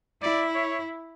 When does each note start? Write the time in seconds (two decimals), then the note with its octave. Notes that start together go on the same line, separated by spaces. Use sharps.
0.22 E4 D5
0.55 C#5